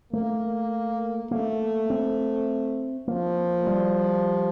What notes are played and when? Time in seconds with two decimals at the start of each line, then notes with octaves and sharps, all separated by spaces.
0.13 A3 A#3
1.31 A3 A#3
1.90 C4
3.08 F3 A#3
3.67 G3